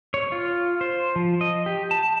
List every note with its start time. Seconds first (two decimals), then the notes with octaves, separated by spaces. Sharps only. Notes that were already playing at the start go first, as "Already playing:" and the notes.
0.14 C#5
0.32 F4
0.81 C5
1.16 F3
1.41 D#5
1.66 G4
1.91 A5